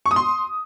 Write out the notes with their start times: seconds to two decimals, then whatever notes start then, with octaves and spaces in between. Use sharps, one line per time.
0.06 C#6
0.11 D#6
0.16 C6